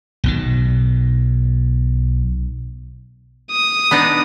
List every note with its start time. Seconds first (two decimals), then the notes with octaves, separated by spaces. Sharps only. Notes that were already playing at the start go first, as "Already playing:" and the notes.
0.24 B1 B2 D#3
3.51 D#6
3.91 B3 D4 D#4